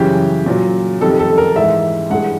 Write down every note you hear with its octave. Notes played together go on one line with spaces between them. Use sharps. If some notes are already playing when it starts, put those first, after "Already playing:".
Already playing: F#2 C#3 E3 G3 G4
A#2 F#3
F2 C3 D#3 G3 A4
A4
A#4
G#2 E3 G#3 E5
G2 E3 G#3 F#5